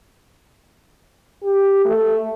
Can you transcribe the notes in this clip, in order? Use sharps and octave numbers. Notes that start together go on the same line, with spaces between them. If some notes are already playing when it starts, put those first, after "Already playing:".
G4
A3